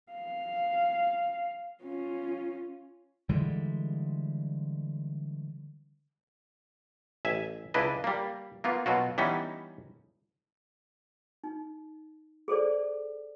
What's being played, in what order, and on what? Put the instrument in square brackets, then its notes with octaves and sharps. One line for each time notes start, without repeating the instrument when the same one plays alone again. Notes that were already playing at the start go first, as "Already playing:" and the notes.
[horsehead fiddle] F5
C#4 F4
[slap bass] D3 E3 G3 G#3
[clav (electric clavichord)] A1 E5 G#5
C#2 D4 E4 B4 D#5
G3 A#3
A#3 B3 F4
B2 F#3 F4 F#4
E3 G3 B3 C#4 D#4
[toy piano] D#4
G#4 A4 C5 D5